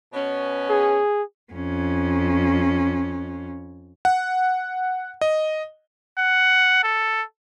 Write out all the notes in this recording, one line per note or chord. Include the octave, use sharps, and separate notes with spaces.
B2 B3 C#4
G#4
F2 C#4
F#5
D#5
F#5
A4